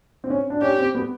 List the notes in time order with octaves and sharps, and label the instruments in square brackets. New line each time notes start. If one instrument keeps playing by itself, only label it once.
[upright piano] C4
C#4
D4
[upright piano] C#4 [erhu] G4
[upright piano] C4
B3